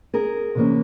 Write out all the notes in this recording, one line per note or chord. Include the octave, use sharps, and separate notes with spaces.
G#4 A#4
C3 E3 G3 A#3 C#4